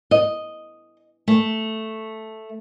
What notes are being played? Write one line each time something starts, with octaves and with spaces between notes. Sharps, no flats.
D#5
A3